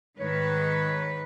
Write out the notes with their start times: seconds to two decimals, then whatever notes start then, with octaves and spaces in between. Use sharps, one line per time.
0.20 G#2 D#3 B4 C#5